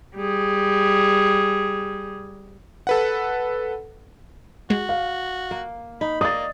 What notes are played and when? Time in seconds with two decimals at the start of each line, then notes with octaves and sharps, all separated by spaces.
0.16 G3 G#4
2.87 A4 B4 F#5
4.70 G#3 F#4
4.89 F5
5.51 A#3
6.01 D#4 B5
6.21 A#3 D5 D#5 F5 D#6 A6